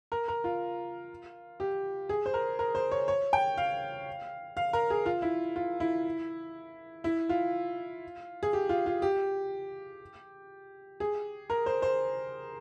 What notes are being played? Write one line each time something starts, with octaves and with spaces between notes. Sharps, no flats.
A#4
A#4
F4
G4
G#4
C5
A#4
A#4
C5
C#5
C#5
G5
F5
F5
A#4
G#4
F4
E4
F4
E4
E4
F4
G#4
G4
F4
F4
G4
G#4
A#4
C5
C5